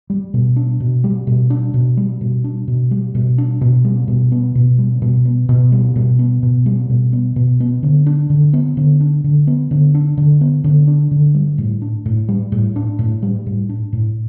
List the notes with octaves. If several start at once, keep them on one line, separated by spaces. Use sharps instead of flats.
G3
B2
D4
B2
G3
B2
D4
B2
G3
B2
D4
B2
G3
B2
D4
B2
G3
B2
B3
B2
G3
B2
B3
B2
G3
B2
B3
B2
G3
B2
B3
B2
B3
D3
D4
D3
B3
D3
D4
D3
B3
D3
D4
D3
B3
D3
D4
D3
G3
A2
D4
A2
G3
A2
D4
A2
G3
A2
D4
A2